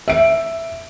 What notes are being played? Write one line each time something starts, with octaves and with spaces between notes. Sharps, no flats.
E5 D7